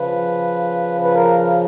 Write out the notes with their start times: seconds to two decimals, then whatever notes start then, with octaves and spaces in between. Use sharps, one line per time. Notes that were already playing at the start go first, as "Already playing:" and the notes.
Already playing: C#3 F3 B4
1.03 B4
1.15 A#4